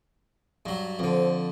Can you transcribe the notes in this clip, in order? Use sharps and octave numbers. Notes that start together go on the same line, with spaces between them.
G2 F#3
F2 D3 A4 C5